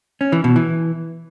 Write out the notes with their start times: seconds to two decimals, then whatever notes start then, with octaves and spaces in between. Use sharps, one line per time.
0.21 C#4
0.32 E3
0.44 B2
0.56 E3